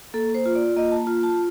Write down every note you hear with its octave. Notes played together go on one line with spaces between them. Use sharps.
A#3 A4
C5
F4
D5
A#3 D#5
A5
F4
A5